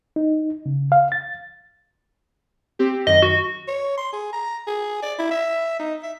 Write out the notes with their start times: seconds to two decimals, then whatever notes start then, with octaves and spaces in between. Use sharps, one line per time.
0.16 D#4
0.66 C#3
0.92 F5
1.12 A6
2.79 C4 G4
3.07 F#2 D#3 D#5
3.22 F#4
3.68 C#5
3.98 C6
4.13 G#4
4.33 A#5
4.67 G#4
5.03 D5
5.19 E4
5.31 E5
5.80 D#4
6.03 E5